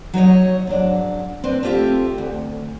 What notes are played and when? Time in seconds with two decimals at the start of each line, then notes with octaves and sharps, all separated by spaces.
0.14 F#3 D#4 C#5 D#5
0.67 G#2 F#3 D4
1.44 C4 D4 B4
1.63 A3 C4 F4 G4 E5
2.18 D2